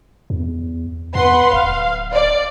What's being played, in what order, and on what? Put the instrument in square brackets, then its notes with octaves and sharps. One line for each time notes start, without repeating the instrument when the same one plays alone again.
[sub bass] E2
[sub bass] E2 [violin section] B4 F#5 C6
[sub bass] D1 [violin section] F5
[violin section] D5